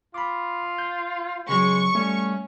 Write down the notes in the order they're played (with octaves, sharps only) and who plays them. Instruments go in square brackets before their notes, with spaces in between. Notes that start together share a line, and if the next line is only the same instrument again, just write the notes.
[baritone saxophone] F4 [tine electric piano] B5 D6
[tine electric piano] G6
[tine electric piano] C#3 F#3 [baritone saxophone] G#3 [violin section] C#6
[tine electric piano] G3 A3 [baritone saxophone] C#4